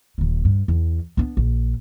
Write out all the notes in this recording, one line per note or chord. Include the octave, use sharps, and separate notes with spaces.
D#1 D#3
G2
E2
B3 D4
A#1